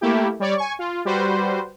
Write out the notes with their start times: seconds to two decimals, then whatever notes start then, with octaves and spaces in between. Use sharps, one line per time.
0.01 A3 A#3 E4 G4
0.40 G3 C#5 D5
0.57 G#5 C#6
0.79 F4
1.05 G3 F#4 B4 C5